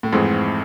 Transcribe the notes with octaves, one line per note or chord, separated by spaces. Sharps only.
A2
F2 G#2 E3 A3 C4 G#4